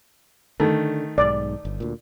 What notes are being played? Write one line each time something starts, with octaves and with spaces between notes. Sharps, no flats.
D3 D#3 A3
B1 G#2 D5
G1
D2 A#2